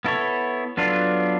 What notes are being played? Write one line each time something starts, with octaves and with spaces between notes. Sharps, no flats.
B3 E4 A4 C#5
F#3 B3 D4 F4 A4